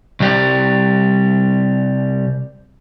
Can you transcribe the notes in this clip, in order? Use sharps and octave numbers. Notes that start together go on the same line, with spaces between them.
C2 G3